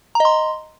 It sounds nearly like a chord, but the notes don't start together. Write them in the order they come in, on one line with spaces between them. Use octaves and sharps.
A#5 D#5 C6